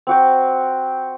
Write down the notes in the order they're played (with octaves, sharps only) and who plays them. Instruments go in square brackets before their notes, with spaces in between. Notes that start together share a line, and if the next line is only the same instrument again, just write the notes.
[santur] C4 F#4 G5